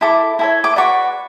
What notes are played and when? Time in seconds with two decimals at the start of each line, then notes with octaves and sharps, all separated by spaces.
0.01 E4 A4 D6
0.39 E4 A4 C#5
0.64 D6
0.76 F#4 B4 D5 C#6